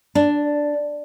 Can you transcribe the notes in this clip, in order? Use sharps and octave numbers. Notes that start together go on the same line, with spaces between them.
D4